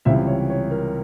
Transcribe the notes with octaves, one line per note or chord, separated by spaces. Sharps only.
C#2 C3 E3 G3 E5
C#5
C#5
A#4